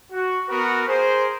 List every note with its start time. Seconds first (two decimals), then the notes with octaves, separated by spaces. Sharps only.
0.12 F#4
0.49 B3 F#4 A#4 B4
0.87 G#4 A#4 C5